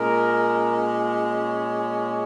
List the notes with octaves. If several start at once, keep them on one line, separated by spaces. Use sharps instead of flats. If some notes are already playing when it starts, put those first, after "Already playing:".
Already playing: A#2 G#3 C#4 A#4
C#5